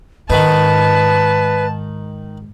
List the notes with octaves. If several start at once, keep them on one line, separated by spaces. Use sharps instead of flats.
G#2 D#3 D#4 B4 A5